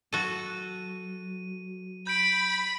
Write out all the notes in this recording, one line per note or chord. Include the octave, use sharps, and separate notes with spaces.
F#3 F#4 A4 D#7
B5 G6 D7